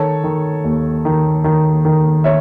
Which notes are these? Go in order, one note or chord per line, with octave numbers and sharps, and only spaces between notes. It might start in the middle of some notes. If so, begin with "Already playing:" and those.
Already playing: D#3 A4 C#5
D#3
D#2
D#3
D#3
D#3
C#5 E5